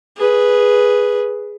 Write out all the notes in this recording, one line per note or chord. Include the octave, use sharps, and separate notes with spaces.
G#4 B4